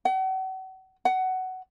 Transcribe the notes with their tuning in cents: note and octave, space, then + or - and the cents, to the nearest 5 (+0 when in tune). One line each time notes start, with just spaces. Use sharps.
F#5 +40
F#5 +15